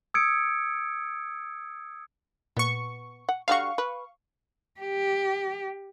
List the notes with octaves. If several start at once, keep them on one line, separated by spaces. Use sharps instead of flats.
D#6 E6 G#6 C#7 D7
A#2 B3 C#6
F#5
D3 G3 F#4 F5 C#6
B4
G4